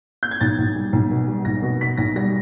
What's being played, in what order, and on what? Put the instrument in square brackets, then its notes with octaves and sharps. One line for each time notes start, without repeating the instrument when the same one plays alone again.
[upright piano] G6
G#6
B1 A6
B1
G3
B1
B2
G3
B1 A#6
B2
B2 B6
B1 A#6
G3 A#6